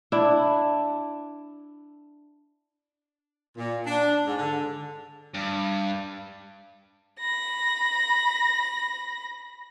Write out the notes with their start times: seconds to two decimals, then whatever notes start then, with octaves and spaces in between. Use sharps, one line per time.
0.12 D4 E4
3.56 A#2
3.86 D4
4.26 G#2
4.39 D3
5.34 G2
7.20 B5 A#6